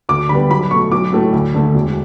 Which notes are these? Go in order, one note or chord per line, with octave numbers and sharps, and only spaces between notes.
D2 D6
D3 G3 B3 B5
B1 B5
B2 A3 C#6
B1 D6
A2 F#3 A3
D2
D3 A3
E1